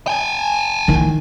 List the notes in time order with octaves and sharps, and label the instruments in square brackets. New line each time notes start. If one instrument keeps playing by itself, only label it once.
[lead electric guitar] G5 G#5
[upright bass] D#3 E4